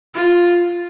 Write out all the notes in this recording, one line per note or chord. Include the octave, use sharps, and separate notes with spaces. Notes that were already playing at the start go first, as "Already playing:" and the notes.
F4